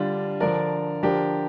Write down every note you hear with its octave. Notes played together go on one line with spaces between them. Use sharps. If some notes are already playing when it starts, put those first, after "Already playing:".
Already playing: D3 G3 D4 F4
D3 F3 D4 A#4 D5
D3 F3 D4 G4 A#4